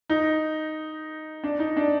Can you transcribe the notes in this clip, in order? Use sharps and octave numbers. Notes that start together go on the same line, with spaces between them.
D#4
D4
D#4
D4